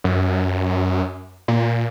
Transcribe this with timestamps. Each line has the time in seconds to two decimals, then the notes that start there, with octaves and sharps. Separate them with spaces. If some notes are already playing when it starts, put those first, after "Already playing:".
0.04 F#2
1.48 A#2